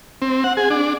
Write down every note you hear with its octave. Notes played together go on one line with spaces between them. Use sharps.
C4
F#5
G#4
D4